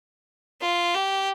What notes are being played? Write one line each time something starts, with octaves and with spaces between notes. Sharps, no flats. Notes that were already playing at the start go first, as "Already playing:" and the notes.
F4
G4